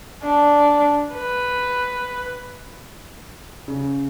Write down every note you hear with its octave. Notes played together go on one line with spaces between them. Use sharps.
D4
B4
C#3